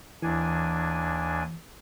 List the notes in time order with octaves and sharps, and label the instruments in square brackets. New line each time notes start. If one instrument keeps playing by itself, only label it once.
[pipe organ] D#2 D4 G#5 [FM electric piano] E3